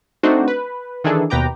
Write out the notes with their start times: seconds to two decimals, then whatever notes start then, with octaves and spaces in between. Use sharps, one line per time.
0.23 A3 C4 D4 D#4 F#4 C5
0.48 B4
1.04 D#3 E3 D4 G#4 A4
1.30 D#2 B2 B4 G5 A#5 D6